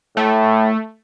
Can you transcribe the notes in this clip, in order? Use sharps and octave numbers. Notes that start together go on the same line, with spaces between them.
A2 A3